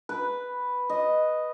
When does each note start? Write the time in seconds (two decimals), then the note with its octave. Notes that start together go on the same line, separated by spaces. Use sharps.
0.09 B4
0.90 D#5